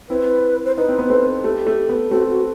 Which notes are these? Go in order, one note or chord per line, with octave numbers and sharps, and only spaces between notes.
C4 E4 B4
C5
D#4 B4
C4
B3
A3 C4
A3 G4
A3
B3
A3 C4 F#4
F#4